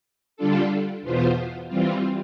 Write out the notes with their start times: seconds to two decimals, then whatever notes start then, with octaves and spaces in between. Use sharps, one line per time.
0.37 D3 G3 D4 F4 A4
1.02 E2 B2 B3 F4 C5
1.68 E3 G3 C4 F4